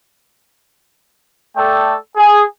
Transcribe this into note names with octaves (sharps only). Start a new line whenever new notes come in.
A3 A4 D5 G5
G#4